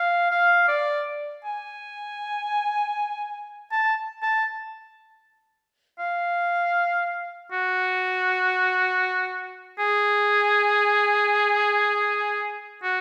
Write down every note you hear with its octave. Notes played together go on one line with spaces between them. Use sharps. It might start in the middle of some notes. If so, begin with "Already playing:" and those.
Already playing: F5
F5
D5
G#5
A5
A5
F5
F#4
G#4
F#4